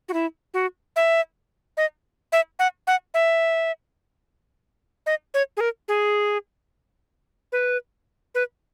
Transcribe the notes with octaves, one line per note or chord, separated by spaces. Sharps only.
F#4
E4
F#4
E5
D#5
E5
F#5
F#5
E5
D#5
C#5
G#4
A#4
G#4
B4
B4